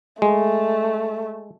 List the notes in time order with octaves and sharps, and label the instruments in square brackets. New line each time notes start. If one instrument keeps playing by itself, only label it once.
[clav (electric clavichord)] G#3 [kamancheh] A3